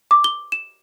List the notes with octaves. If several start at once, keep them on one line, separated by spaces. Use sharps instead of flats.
D6
G7
E7